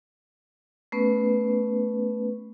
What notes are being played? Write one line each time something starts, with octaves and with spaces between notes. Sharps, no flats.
A3 B3 C#4 B4